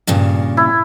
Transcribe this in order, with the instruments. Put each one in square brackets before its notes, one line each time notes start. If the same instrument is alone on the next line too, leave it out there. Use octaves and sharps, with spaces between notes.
[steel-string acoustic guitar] G2 A#2 C#3
[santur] E4